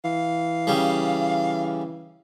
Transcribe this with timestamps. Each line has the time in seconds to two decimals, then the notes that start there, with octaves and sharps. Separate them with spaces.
0.04 E3 F5
0.67 C#3 G3